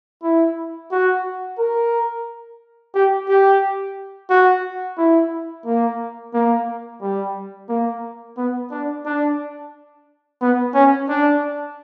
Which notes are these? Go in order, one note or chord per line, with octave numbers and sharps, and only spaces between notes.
E4
F#4
A#4
G4
G4
F#4
E4
A#3
A#3
G3
A#3
B3
D4
D4
B3
C#4
D4